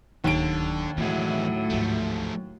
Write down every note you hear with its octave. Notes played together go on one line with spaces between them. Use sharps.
D1 D#2 D3 F#3 D7
E2 A2 F#3 G#3 C4
D2 G#2 F3 A3